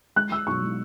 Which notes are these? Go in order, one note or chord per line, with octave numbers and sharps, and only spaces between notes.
G#3 F#6
G#3 E6
B1 C#6
G#3